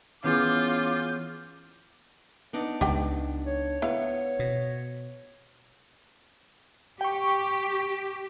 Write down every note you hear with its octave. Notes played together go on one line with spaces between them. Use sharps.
E3 B3 C#4 F4 G#4 D6 G6
B3 D4 D#4
C#2 G4 G5
C#5
B3 E4 F5
B2
G4 G5 C#6